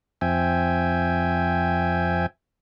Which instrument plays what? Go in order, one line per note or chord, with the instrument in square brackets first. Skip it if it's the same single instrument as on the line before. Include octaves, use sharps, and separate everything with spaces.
[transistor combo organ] F2 C4 E5 G5 G#5